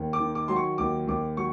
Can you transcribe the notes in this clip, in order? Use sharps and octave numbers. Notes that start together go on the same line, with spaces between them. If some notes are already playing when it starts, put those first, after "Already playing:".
Already playing: D#2
D6
D#3
D6
F#3 C6
C#6
D#2 D6
D#2 D6
F#3 C#6